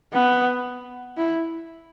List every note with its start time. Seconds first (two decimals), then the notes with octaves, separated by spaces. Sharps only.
0.13 B3
1.17 E4